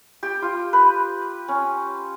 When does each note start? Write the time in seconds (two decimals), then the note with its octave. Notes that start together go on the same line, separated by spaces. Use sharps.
0.23 G4
0.42 F4
0.73 B4
1.48 C#4